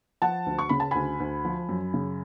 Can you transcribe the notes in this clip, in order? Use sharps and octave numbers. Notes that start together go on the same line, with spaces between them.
F3 F#5 A5
D2
C#6
C#3 B5
A5
D2 G#5 B5
D2
F3
F#2
C#3